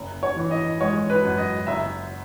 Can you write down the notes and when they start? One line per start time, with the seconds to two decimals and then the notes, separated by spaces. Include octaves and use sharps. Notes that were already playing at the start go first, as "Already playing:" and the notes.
Already playing: F#1
0.23 C#5
0.36 E3
0.51 D#5
0.81 G#3 C#5
1.10 B4
1.24 F#2
1.38 D#5
1.67 F#1 E5